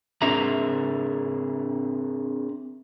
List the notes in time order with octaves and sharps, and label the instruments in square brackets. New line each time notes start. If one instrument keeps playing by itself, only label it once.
[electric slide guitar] C4 D4 G#4 A#4 E5 A#5